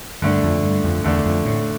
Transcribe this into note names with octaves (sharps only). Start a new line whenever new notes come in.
G2 D3 A3 D4
F2
G2
F2
E2 D3 A3 D4
F2
A2